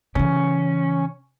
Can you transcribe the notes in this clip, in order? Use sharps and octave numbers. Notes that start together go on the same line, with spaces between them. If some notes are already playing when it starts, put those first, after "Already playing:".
C#3 E3 C#4